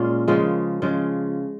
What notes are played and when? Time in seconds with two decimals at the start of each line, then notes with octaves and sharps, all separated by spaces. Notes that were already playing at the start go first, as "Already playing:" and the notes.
Already playing: A#2 G#3 C#4 F4
0.28 C#3 F3 G#3
0.82 C#3 F3 G#3